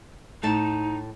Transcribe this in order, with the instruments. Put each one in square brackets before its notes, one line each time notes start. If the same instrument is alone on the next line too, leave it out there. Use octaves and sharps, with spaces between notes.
[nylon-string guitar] A2 A5 [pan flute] D#4